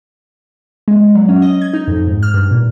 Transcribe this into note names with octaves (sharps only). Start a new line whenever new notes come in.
G#3
F#3
C#4
D#5
G#6
D#4
F2
G#2
F6
G2
A#2